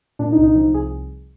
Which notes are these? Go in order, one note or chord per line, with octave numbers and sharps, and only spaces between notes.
A#2 D4
D#4
C2
D#4
F3 D#4
C2 G#4